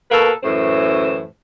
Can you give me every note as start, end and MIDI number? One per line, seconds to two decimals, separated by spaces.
0.10 0.30 47
0.10 0.30 58
0.10 0.30 69
0.10 0.30 71
0.43 1.25 42
0.43 1.25 45
0.43 1.25 52
0.43 1.25 72